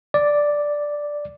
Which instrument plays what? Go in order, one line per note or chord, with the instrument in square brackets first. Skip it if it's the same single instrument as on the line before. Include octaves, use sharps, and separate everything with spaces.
[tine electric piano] D5